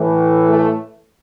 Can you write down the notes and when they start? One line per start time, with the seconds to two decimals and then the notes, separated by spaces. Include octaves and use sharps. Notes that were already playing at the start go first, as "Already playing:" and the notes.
Already playing: A2 E3
0.50 A3